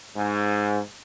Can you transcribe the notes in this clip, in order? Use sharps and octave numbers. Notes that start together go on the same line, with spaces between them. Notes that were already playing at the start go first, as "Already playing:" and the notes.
G#2